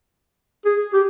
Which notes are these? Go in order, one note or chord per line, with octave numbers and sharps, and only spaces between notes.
G#4
G4